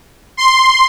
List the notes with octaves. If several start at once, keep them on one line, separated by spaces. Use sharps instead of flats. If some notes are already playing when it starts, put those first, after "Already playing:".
C6